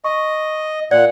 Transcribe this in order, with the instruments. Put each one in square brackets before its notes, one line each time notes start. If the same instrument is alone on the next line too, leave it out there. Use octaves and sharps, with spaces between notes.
[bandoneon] D#5 [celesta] C#6
[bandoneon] A#2 F#5 [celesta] D5